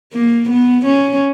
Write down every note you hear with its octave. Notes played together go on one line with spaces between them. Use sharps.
A#3
B3
C#4